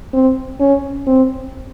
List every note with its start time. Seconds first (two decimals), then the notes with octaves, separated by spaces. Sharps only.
0.14 C4
0.60 C#4
1.07 C4